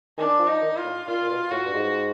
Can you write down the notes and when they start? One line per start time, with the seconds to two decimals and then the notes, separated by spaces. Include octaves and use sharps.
0.18 D#3 D4
0.39 F3
0.47 D#4
0.62 D#3
0.77 F4
0.84 A2
1.07 A#2 F4
1.23 A#2
1.30 B2
1.51 A2 F#4
1.66 G2
1.74 G#2